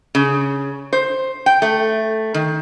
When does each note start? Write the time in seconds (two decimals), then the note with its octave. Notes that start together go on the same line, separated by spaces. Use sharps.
0.15 C#3
0.93 C5
1.46 G5
1.62 A3
2.34 D#3